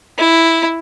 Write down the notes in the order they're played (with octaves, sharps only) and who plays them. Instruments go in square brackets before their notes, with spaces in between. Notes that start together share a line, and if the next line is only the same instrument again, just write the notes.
[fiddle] E4